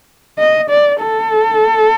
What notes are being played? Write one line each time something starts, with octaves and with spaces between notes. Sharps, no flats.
D#5
D5
A4